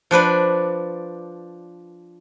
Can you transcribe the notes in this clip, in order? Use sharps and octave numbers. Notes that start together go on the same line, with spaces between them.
F3 D4 B4 D5